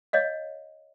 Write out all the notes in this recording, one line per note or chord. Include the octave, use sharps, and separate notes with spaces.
C#5 D#5 F5